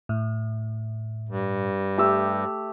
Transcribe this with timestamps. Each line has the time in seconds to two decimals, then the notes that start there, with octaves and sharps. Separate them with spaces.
0.09 A2
1.29 G2
1.97 A3 G4 E6